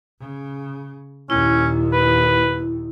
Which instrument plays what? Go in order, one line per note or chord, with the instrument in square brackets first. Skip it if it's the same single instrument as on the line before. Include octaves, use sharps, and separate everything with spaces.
[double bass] C#3
[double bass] D#2 A#2 [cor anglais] C#4 [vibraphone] E4
[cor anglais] B4